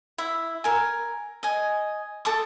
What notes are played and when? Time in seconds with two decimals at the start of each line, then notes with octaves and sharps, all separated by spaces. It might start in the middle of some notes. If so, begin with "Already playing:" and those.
0.18 E4 E5
0.64 A#4 G#5
1.43 D#5 G#5
2.25 A4 A5 D6 D#6